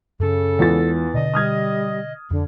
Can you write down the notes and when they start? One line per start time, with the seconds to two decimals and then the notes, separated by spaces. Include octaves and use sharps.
0.20 F#2 C#3 C#4 A4
0.59 E2 E3 G#3 F4 A6
1.14 B2 D3 D5 D#5
1.34 G3 D#6 F6 G#6
2.31 F2 D3